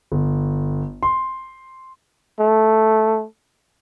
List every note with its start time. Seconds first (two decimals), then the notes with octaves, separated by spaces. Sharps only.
0.12 G1
1.03 C6
2.40 A3